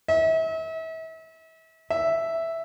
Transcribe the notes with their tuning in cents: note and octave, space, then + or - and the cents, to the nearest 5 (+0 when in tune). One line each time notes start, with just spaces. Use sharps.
E5 -35
E5 +0